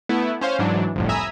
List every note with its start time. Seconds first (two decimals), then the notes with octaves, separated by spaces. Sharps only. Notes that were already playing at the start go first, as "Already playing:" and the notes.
0.09 A3 B3 E4
0.41 C#4 C5 F5
0.59 G#2 E3 F#3 D4
0.95 G1 C2 F2 A2
1.09 E5 G#5 A#5 B5 D#6 E6